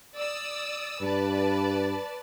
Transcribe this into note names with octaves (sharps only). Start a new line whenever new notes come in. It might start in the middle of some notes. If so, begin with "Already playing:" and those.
D5 D#6 E6
G2 B4 D5 A5